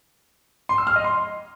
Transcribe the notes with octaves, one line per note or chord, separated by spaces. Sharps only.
C6
E6
F6
D#5
C6